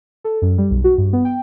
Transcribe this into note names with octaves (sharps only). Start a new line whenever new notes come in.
A4
F#2
G3
B1
F#4
G2
B3
G5